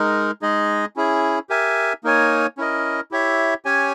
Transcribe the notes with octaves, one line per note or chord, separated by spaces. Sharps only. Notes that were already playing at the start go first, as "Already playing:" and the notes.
Already playing: G#3 D#4 A#4
G#3 D#4 G#4 D#5
C#4 E4 G#4
G4 A#4 E5 G#5
A#3 D#4 A#4 C#5 G#5
C#4 E4 A#4 D#5
E4 G4 C#5 E5
C#4 G4 C#5 G#5